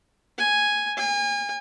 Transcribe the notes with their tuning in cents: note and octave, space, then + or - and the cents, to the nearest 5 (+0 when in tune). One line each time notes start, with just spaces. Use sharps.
G#5 +0
G#5 -35